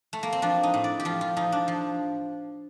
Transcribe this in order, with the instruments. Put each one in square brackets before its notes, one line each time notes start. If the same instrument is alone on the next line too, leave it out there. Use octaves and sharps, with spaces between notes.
[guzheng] A3
A#3
C4
F3 D4
D#4
A2
D5
G4
F3 F4
F4
F3 D#4
D4
F3